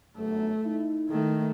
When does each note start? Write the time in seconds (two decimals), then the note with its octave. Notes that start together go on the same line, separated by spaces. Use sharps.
0.17 G1 F#2 A3
0.65 D#4 E4
1.10 D#3 A3